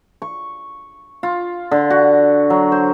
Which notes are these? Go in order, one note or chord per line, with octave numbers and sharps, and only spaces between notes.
C#6
F4
D3
F#4
F#3
C5